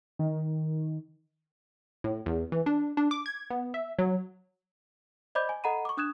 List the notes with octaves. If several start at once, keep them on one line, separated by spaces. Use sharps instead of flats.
D#3
A2
E2
E3
D4
D4
D6
G#6
B3
E5
F#3
C5 D5 D#5 B5 D6 G6
G#5
A4 D#5 F#5 A#5 B5 D#7
C#6 D6
D4 D#6 F#6 G#6 E7